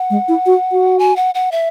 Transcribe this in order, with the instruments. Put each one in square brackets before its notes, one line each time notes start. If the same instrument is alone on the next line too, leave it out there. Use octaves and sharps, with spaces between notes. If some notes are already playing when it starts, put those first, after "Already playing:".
Already playing: [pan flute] F#5
[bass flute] G#3
E4
F#4
F#4
[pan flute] G#5
F#5
F#5
E5